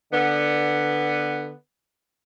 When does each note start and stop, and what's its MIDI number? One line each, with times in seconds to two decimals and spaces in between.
0.12 1.51 50
0.12 1.51 59